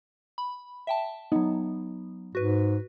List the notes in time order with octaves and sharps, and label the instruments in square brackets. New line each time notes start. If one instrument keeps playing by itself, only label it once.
[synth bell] B5
E5 G5 A5
[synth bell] F#3 B3 [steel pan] D#4
[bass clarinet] G#2 [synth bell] F#4 B4